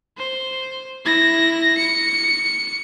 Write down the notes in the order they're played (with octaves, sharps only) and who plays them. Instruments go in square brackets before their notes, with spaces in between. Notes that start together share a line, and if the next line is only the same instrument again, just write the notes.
[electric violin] C5
E4 A#6
C#7